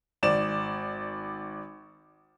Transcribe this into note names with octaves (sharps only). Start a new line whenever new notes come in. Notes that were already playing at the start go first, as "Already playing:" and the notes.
G#1 D5 E7